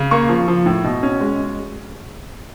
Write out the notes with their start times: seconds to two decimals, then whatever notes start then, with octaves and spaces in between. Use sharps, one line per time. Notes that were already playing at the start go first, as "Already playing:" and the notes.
Already playing: C#3
0.11 A#3 C#6
0.29 F3
0.48 F3
0.66 A2
0.84 B2
1.03 C#4
1.21 G#3